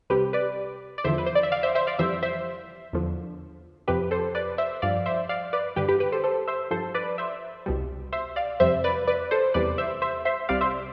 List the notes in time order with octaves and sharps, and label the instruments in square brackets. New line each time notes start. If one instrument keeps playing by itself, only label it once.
[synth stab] C2 C3 G3 G4 B4
B4 D5
D5
E2 D3 F3 C5 E5
B4
C5
D5
E5
D5 F5
C5 E5
C5 E5
D5 F5
F2 E3 G3 C5 E5
C5 E5
E2 D3 F3
F2 C3 F3 G4 B4
A4 C5
B4 D5
C5 E5
G2 F3 D5 F5
C5 E5
D5 F5
B4 D5
G2 D3 G3 G4 B4
G4 B4
G4 B4
A4 C5
A4 C5
C5 E5
G2 F3 A4 C5
B4 D5
C5 E5
C2 B2 G3
C5 E5
D5 F5
F2 C3 G3 C5 E5
B4 D5
B4 D5
A4 C5
E2 C3 E3 G3 B4 D5
C5 E5
C5 E5
C5 E5
C2 C3 G3 D5 F5
C5 E5